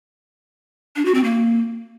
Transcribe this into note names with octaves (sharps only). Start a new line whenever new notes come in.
D4
F#4
C4
A#3